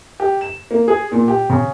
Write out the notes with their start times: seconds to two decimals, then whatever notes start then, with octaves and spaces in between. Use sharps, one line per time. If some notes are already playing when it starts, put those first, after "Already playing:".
0.20 G4
0.41 E7
0.71 A#3
0.88 G#4
1.12 A#2
1.28 G4
1.50 C#3